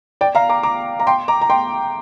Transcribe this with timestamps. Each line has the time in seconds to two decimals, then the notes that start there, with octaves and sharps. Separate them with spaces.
0.21 D5 G5
0.35 F5 A#5
0.49 A#5 D6
0.63 A#5 D6
1.00 A#5
1.07 G5 C6
1.28 A#5 D6
1.41 A#5
1.50 G5 C6